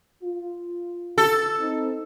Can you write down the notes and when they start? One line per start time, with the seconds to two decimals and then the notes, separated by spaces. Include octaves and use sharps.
0.24 F4
1.18 A4
1.59 C4 D#4